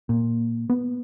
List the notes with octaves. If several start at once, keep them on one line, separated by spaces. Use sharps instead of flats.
A#2
B3